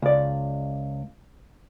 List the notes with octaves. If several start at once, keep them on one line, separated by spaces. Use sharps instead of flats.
C#2 D5